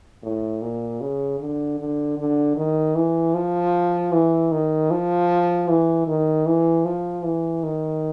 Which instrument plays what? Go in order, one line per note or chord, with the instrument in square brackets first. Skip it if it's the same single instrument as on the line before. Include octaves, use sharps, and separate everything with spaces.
[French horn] A2
A#2
C#3
D3
D3
D3
D#3
E3
F3
E3
D#3
F3
E3
D#3
E3
F3
E3
D#3